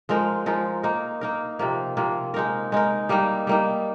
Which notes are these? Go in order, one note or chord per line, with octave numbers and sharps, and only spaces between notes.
F3 G#3 D#4 A#4
F3 G#3 D#4 A#4
A#3 D#4 A#4
A#3 D#4 A#4
C3 F3 A#3
C3 F3 A#3
G#3 D#4 A#4
G#3 D#4 A#4
G3 A#3 D#4
G3 A#3 D#4